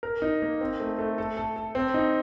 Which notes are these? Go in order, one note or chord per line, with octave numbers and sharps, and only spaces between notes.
A#4
D#4
A#3
C4
A3
A3
A4
A4
A4
C4
D#4